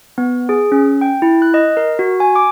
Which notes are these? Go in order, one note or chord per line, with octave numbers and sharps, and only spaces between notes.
B3
G#4
C#4
G5
E4
F#6
D#5
A#4
F#4
G#5
D6